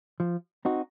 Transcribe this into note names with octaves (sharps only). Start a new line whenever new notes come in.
F3
C4 D#4 F#4